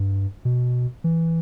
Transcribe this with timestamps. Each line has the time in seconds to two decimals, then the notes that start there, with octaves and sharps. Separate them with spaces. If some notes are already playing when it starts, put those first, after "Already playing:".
Already playing: G2
0.45 B2
1.04 E3